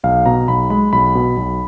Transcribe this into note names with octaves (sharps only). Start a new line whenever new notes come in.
B1 F5
B2 A#5
B1 B5
G#3 B5
B1 B5
B2
B1